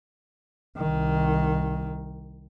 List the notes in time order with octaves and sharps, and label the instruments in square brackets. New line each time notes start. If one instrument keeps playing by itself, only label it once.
[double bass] C2 D#3